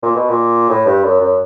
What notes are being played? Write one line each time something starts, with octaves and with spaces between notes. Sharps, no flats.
A#2
B2
A#2
A2
G2
F#2
F#2